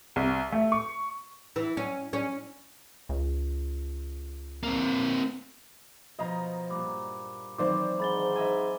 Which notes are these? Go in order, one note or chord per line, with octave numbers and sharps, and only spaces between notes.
C2
A3
C#6
E3
C#4
C#4
C#2
A#3 C4
B2 F3 D#5 A#5
G2 A#2 B5 D6
D#3 E3 F#3 C4 C5 D5 D6
G#2 B5 A6 G7
D#5 E5 G#5